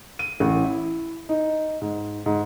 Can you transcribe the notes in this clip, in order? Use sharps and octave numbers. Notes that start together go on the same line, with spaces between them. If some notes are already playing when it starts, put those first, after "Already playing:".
D#7
A1
E4
D#4
G#2
G#2